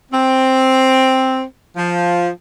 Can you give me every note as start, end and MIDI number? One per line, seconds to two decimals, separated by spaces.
0.12 1.42 60
1.77 2.28 53